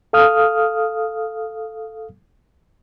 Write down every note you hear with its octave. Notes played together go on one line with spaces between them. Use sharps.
A4 F5 D#6 F6